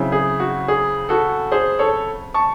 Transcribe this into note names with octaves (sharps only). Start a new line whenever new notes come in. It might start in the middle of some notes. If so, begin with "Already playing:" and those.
Already playing: C#3 F#3 C4 E4
G#4
F#4
G#4
F#4 A4
G#4 C5
A4 C#5
A5 C#6